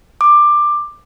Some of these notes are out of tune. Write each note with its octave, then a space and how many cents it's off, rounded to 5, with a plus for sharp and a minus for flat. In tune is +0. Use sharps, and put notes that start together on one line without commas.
D6 +15